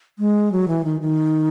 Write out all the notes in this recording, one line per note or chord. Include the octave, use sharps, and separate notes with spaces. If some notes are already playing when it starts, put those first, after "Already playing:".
G#3
F#3
E3
D#3
D#3